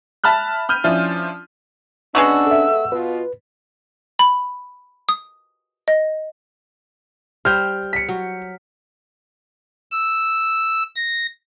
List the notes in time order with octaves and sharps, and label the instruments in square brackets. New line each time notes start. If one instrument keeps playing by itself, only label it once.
[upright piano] E5 A5 B5 F6 F#6
B5 F6 G6 D#7
F3 C#4 D4 E4 F4
[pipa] G#3 B3 F#4 [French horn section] C#4 D4 [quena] E6
[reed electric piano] A4 E5
[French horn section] B2 F4 [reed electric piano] B4
[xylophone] B5
D#6
D#5
[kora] G3 C5 [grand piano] F6 G6
[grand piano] B6 C#7
[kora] F#3
[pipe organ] E6
A#6